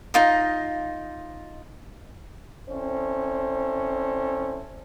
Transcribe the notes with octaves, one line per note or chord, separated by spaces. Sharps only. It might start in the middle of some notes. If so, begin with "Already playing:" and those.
D#4 F4 D#5
C4 C#4 E4 A4 C5 D5